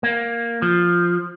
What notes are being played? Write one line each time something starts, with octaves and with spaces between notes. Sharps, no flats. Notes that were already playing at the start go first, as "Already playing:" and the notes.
A#3
F3